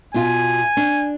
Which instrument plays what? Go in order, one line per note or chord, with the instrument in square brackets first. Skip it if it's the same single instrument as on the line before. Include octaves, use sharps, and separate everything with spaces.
[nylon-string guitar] B2 F4 [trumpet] G#5
[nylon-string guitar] D4